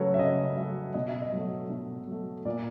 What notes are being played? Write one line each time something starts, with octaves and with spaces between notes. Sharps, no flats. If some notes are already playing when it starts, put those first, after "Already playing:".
Already playing: C#3 F#3 A3 A4 B4 C#5
E5
C#3 D#5
F#3 A3 E5
B2 D#5
E5
D#5
F#3 A3
B2
F#3 A3
A#2 D5